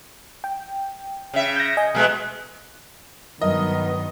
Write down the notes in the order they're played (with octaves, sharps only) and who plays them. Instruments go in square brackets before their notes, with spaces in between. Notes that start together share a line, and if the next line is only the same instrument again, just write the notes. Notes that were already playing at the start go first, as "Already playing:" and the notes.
[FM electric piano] G5
[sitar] C#3 E5
[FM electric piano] G6 A#6
D#5 G#5
[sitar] B2 G#3 A3
[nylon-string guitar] G2 F#3 [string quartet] D#3 B3 [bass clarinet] A#4 [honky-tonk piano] D#5